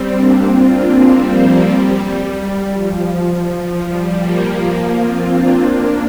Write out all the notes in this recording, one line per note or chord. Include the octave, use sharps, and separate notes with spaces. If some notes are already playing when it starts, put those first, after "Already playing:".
Already playing: G3 C4
A#3 D4
C4 F4
A#3 D4
G3 C4
F3 A#3
G3
G3
F3
G3
F3 A#3
F3 A#3
C4 F4
A#3 D4
A#3 D4